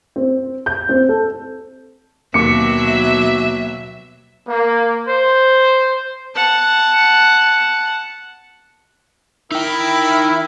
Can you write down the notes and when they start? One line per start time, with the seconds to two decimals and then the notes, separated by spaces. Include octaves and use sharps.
0.16 C4
0.66 G6
0.89 C4
1.09 A4
2.34 D#2 B2 F#3 E5 D6 C#7
4.48 A#3
5.08 C5
6.35 F#5 A5
9.52 D#4 E4 A#4 E5 G5